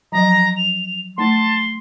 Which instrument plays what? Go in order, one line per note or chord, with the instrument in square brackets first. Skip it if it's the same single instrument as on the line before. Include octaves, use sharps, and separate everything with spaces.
[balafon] F3 F#3 [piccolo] A#5
[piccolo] F7
[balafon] A3 D#4 [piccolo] A5 [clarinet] C6